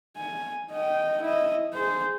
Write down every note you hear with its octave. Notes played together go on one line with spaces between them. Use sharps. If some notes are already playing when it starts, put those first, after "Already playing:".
G#5
D#5 G5
E4 D#5
G#4 C5